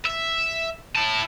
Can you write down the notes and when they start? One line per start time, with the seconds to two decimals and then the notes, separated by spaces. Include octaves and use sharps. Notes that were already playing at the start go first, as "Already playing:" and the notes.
0.05 E5
0.96 E4 A5